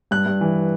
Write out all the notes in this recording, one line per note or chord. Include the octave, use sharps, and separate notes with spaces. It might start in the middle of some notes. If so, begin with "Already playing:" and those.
G2 F#6
G2
E3